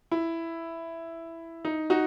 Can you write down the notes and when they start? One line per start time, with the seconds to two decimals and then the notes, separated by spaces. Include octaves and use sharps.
0.12 E4
1.65 D#4
1.90 D#4 F#4